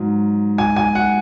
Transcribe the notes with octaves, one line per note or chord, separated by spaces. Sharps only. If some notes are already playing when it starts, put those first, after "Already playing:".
Already playing: G#2 F#3
G#5
G#5
F#5